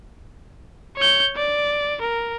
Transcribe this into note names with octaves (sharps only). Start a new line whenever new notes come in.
C#5 G6
D5
A#4